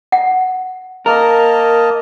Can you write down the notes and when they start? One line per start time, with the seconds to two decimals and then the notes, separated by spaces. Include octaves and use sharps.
0.12 F#5
1.06 A#3 A#4 D#5 A5